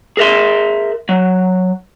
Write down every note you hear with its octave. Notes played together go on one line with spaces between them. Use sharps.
G#4 A#4 E5 C6
F#3